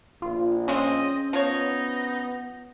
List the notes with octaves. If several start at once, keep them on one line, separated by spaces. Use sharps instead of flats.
A#1 F4
C#3 G#3 C4 C#4 D#5
F3 B3 D#4 C#5